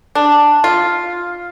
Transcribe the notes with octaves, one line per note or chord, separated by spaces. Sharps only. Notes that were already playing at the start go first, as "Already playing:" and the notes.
D4
F4